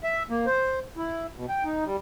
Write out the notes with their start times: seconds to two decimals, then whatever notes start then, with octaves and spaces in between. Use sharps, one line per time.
0.04 E5
0.30 A#3
0.46 C5
0.97 E4
1.36 B2
1.49 G5
1.64 D#4
1.84 G3